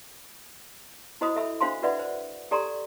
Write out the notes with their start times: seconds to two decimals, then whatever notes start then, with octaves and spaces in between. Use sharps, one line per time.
1.21 E4 F#4 C5 D#5 B5 D#6
1.36 A4 E5 B5 E6
1.61 D4 F#4 C5 F5 B5 C6
1.83 F#4 B4 D5 E5 F#5 B5
1.99 C5
2.51 G4 A4 D5 A#5 C6